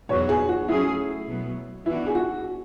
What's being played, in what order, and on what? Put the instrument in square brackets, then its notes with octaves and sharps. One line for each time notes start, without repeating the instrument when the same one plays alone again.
[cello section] E2 B2 F#3 B3 F#4 [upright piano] C#5
[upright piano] G#4
F#4
[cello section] F#3 A3 C#4 G#4 [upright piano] E4
[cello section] B2 F#3 B3
[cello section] E3 B3 D4 F#4 [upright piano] E4
[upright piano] G#4
F#4